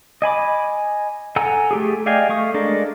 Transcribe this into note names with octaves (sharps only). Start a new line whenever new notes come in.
D#5 G#5 B5 D6
A4 F#5 G#5 A#5 E6
A3 G4 G#4
D5 D#5 F5 G5 G#5
A3 F5 C#6 D#6
G#3 D4 A4 A#4